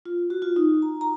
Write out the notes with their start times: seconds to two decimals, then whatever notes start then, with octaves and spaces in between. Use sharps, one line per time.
0.06 F4
0.30 F#4
0.42 F4
0.56 D#4
0.82 A#5
1.01 A#5